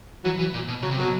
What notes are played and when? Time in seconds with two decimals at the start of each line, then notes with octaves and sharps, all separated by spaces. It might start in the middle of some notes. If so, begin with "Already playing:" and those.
0.24 E3 F#3
0.39 E3
0.54 A#2
0.68 B2
0.82 C#3 F#3
0.91 C3
0.97 B2 F#3